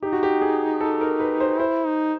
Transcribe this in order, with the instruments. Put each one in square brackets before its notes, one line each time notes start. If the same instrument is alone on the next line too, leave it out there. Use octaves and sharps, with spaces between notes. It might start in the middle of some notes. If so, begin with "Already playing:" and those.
[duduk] D#4 [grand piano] G4
[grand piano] F#4
G4
G#4
A4
A#4
B4
C5
[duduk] E4 [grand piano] C5
[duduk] D#4